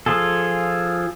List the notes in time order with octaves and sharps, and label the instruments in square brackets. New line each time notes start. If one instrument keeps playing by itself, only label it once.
[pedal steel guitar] F3 F4 G#4 A4